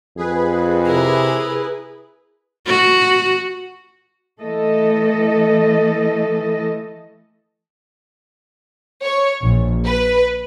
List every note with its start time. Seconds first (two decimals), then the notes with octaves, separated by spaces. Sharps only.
0.17 F2 G#4 B4
0.86 C3 E4 A#4
2.67 F#4
4.41 E3 A3 A4 D#5
9.03 C#5
9.42 A#1
9.86 B4